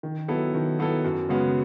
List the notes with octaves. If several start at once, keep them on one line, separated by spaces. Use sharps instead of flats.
D#3
F#3 B3 E4 A4
D#3
F#3 B3 E4 A4
F#2
C#3 G#3 B3 F#4